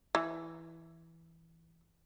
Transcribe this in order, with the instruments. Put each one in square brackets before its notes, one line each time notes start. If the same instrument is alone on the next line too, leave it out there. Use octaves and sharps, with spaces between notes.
[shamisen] E3